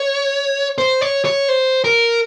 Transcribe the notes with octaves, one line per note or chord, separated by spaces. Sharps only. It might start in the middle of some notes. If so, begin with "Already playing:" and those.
Already playing: C#5
C5
C#5
C#5
C5
A#4